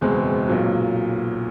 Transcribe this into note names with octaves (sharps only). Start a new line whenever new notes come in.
F#1 E2 B2 G#3 C4
B1 A#2 F#3